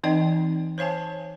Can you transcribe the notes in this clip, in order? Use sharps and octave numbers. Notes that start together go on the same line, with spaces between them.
E3 C4 D#4 D5 D#5 G5
C5 C#5 F5 G#5 A5